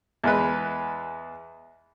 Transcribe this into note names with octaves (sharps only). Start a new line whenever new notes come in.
E2 G#3 B4